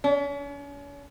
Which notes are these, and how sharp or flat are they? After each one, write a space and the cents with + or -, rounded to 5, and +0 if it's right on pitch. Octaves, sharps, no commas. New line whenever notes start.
C#4 +40